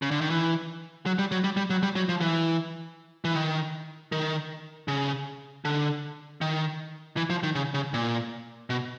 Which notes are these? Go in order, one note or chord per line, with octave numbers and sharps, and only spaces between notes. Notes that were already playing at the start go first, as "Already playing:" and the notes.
C#3
D3
D#3
E3
F#3
G3
F#3
G3
G3
F#3
G3
F#3
F3
E3
E3
D#3
D#3
C#3
D3
D#3
E3
F3
D#3
C#3
C#3
A#2
B2